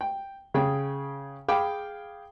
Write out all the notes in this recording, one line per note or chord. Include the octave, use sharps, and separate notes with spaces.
G5
C#3 G#4 G5
G#4 F5 G5 B5 D6